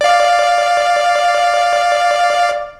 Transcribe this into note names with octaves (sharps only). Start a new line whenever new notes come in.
D5 F5